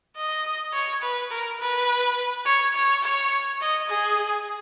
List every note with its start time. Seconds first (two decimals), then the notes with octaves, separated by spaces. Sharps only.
0.17 D#5
0.73 C#5
1.02 B4
1.31 A#4
1.60 B4
2.45 C#5
2.75 C#5
3.03 C#5
3.61 D#5
3.90 G#4